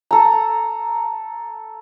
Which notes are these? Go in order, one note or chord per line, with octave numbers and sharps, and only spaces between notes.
A4 A#5